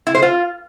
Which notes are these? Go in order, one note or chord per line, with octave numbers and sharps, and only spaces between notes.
E4
C5
F4